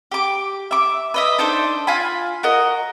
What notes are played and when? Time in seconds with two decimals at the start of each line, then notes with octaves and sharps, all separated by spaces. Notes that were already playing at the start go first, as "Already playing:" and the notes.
0.12 G4 D6
0.71 E5 D6
1.14 B4 D#5 E5
1.38 D4 D#4 A4 C5
1.87 F4 G#5 B5
2.43 F#4 A#4 D#5